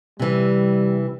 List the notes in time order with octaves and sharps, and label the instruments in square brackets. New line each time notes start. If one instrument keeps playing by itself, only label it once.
[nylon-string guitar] C3 E3 [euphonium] G3